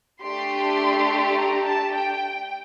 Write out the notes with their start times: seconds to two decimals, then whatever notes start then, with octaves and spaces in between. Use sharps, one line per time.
0.22 A3 D4 G4 C6
1.36 A#5
1.65 A5
1.93 G5